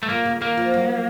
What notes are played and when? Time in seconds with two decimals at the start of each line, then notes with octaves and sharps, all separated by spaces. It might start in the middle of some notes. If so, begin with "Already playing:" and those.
0.03 A3
0.09 A#2 A#3
0.25 C#3
0.41 D#3 A#3
0.57 F3
0.74 F#3